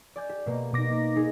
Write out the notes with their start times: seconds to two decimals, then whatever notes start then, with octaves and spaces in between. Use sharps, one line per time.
0.16 D5 G#5 G6
0.29 G4
0.46 B2 A#3
0.73 B2 A#3 D#4 D6 A#6
0.90 A#3
1.16 D#4 G#4